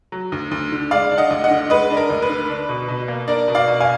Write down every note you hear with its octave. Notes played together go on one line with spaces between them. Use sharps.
F#3
D2
D2
D3
G#3 D5 F5
D4
D#5 F#5
D2
D#5 F#5
D3
G#3 B4 D#5
D4
A#4
D2
B4
D3
D4
B2
B2
A#3
D4 A#4 D5
B2
D5 F5
B2
F5 G#5